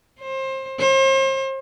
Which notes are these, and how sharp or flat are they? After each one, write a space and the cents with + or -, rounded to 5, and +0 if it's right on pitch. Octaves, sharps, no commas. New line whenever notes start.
C5 +25
C5 +40